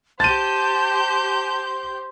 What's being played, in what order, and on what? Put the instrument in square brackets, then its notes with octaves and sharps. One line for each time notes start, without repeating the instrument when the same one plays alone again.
[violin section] G4 G6 [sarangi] C5 [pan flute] A5 [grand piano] A6 D#7